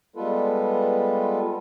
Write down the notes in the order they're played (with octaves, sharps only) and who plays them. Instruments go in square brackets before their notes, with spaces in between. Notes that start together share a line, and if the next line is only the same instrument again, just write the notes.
[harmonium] G3 G#3 B3 F4 A4 B4